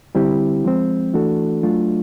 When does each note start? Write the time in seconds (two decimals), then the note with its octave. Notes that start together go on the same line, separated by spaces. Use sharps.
0.15 D3 G3 C4 E4 G4
0.64 F3 G#3 C4
1.13 E3 A3 D4 F#4 A4
1.63 F#3 A3 D4 F4